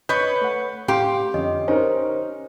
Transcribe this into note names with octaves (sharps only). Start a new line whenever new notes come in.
B4 C#5 D#5 G6
A3 F#5
A2 C#4 G4 F5 C6
F2 D3 C#4 D#5
C#4 D#4 A#4 C5